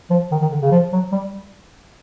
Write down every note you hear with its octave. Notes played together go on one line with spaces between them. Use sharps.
F3
D#3
D#3
D3
C#3
F3
F#3
G3